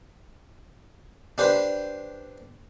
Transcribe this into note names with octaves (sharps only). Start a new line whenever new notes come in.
D4 G4 B4 C5